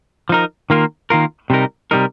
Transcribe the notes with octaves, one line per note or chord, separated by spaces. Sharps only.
F3 D#4 A#4
D#3 A#3 F4 A#4
D#3 A#3 F4 A#4
C3 G3 D#4 A#4
C3 G3 D#4 A#4